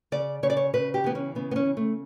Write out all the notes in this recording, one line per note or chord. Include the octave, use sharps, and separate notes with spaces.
C#3 D5
C#3 C#5
D5
C#5
C#3 B4
G4
E3 B3
C#4
C#3 B3
B3
C#4
C#3
A3